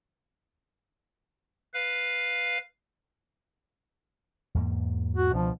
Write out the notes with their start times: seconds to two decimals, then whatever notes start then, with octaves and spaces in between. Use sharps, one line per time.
1.74 B4 F5
4.55 E2 G#2 A#3
5.17 F#4
5.34 C#2 B2 F3 D4